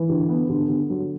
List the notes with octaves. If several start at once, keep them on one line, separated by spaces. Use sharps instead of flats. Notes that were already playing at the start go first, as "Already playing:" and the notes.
Already playing: E3
D3
B3
D3
D3
F#3